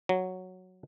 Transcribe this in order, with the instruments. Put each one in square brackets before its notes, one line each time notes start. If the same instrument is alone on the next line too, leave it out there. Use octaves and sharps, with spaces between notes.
[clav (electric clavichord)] F#3